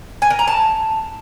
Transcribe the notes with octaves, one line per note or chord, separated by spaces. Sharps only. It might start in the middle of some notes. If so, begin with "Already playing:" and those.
G#5
A#4
A#5
A5